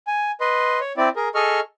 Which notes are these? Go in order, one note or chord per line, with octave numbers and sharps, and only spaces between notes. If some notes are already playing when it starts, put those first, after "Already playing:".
G#5
B4 D#5 C6
C#5
C4 E4 D5
G#4 A#4
G#4 A4 D#5 C#6 F6